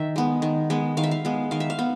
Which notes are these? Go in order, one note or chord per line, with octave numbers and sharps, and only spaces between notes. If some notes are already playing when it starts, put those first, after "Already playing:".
Already playing: D#3 E5
G#3 B3
D#3
G#3 B3
D#3 F5
E5
F5
G#3 B3
D#3 F5
E5
F5
B3